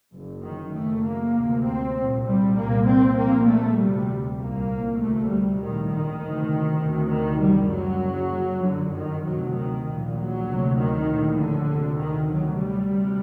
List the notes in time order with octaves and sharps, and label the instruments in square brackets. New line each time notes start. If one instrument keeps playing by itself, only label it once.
[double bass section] F#1 F#2
D#3
F#1 F#2 A3
A#3
D2 C3
C4
C2 A#2
G3
C2 A#2 A#3
C4
A#1 A#2 A#3
A3
D2 C3 G3
C2 A#2 A#3
D2 C3 A3
G3
A#1 A2 D#3
D#3
D2 C3
D2 C3
D#3
F#1 F#2 G3
F#3
F#1 F#2
G1 F#2 D3
D#3
D2 C3 F#3
D#3
A#1 A#2
F#3
D2 C3
D#3
A#1 A2
D3
D2 C3
D#3
D2 C3 F#3
G3
D2 C3